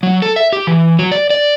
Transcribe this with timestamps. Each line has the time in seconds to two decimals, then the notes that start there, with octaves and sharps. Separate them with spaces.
0.03 F#3
0.22 A4
0.36 E5
0.53 G4
0.67 E3
0.99 F#3
1.11 D5
1.30 D5